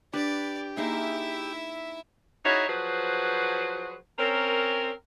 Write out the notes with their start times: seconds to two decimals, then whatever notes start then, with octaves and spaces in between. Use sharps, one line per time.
0.14 D4 G4 B4 D5
0.77 A#3 D#4 E4 G#4 E5
2.45 D#4 E4 F#4 G#4 C#5
2.68 F3 F#3 F#4 G#4 B4 C5
4.18 C4 C#4 A#4